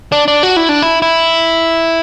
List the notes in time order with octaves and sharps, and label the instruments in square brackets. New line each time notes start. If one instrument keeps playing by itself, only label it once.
[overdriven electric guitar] D4
D4
F#4
E4
D4
E4
E4